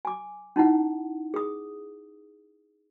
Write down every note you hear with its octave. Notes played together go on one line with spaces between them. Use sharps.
G#5 D6
C#4 D#4 E4 F#5
G#4 D#6